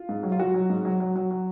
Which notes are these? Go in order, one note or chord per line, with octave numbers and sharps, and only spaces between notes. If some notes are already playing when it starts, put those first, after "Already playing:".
Already playing: F4
G#2
F#3
F4
F#3 F#4
F#3
G#2
F#3
F#3
F#3
F#3